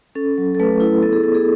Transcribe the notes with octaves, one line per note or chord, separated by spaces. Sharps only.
C#4 A4
F#3
A4
A3 B4
E4
B3 A4
G#4
B3 A4
G#4